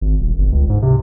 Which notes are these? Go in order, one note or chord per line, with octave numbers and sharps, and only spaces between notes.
G#1
D#1
G1
C#2
G#2
C3